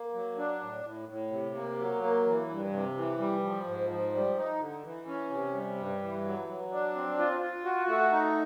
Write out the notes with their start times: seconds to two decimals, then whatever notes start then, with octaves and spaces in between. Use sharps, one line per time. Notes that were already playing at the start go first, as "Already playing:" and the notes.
Already playing: A#3
0.14 F#3
0.38 D4
0.62 A2
0.84 A2
1.09 A2
1.31 C3
1.55 A#3
1.79 F#3
2.03 A#3
2.26 E3
2.49 G2
2.73 C3
2.97 E3
3.19 G3
3.43 F3
3.67 G#2
3.90 F3
4.14 G3
4.38 D#4
4.60 D3
4.84 E3
5.08 C#4
5.30 C3
5.54 G3
5.78 G2
6.02 E3
6.25 F#3
6.48 F#3
6.72 D4
6.95 C4
7.19 F4
7.42 F4
7.65 F#4
7.88 A3
8.12 D#4